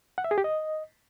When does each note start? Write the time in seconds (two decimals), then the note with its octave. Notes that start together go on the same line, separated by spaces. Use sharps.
0.18 F#5
0.24 E5
0.31 G#4
0.38 G4
0.44 D#5